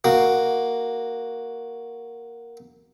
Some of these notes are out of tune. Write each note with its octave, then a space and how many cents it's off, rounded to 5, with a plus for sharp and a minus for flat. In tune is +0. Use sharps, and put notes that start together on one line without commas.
A#3 +0 F#4 +0